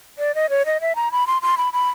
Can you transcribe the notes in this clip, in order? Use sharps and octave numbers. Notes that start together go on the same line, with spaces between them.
D5
D#5
C#5
D#5
E5
A#5
B5
C6
C6
B5
B5